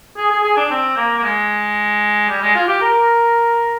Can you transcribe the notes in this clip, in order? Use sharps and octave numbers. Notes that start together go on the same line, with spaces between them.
G#4
G#4
G#4
D4
C4
A#3
A#3
G#3
G3
G#3
F4
G4
A#4